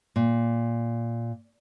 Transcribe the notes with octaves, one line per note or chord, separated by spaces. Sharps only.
A#2